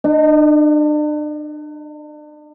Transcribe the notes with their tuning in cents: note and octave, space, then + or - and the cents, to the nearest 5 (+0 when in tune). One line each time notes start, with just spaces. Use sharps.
D4 +40 D#5 +0